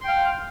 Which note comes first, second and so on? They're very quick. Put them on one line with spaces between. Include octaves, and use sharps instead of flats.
C6 G5 F5